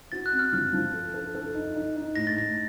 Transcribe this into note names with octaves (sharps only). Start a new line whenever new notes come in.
F#4 A6
F#6
C4
F6
F3 F6
F3
A4
A4
A4
D#4
D#4
D#4
A2 A#6
A6
A2 A#6